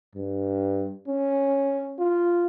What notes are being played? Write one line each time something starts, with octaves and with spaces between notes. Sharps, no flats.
G2
C#4
F4